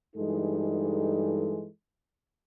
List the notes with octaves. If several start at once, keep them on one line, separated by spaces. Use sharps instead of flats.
G2 E3 G#3 D#4 A4